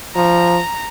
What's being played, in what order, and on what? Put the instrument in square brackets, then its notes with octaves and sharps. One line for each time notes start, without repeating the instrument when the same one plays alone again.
[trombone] F3 [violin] A#5